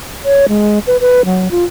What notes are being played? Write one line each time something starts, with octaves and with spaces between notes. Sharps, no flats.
C#5
G#3
B4
B4
F#3
F4